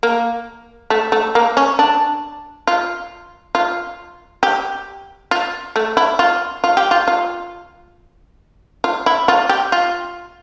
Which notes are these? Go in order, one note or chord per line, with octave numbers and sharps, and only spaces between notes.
A#3
A3
A3
A#3
C#4
D4
F4
F4
G4
F4
A3
E4
F4
F4
G4
F4
F4
F4
E4
F4
G4
F4